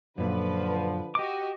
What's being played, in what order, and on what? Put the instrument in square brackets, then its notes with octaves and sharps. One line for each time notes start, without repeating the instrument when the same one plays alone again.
[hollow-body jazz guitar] F#2 A#2 [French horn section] D3 F3 [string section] B4
[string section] F#4 D#5 [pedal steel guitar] G4 D6